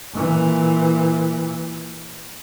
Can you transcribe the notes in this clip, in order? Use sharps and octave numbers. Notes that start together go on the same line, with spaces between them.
A#2 E3